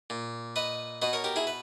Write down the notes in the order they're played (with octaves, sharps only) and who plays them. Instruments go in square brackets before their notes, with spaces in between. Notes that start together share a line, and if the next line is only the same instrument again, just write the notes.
[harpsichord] A#2
B4 D#5
B2 B4 D#5
A#4 C#5
G4 A#4
E4 G#4
B4